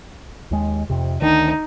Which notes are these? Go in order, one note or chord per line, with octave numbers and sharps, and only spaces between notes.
D#2 G#3
F2 C3
D2 D#3 D4 D#4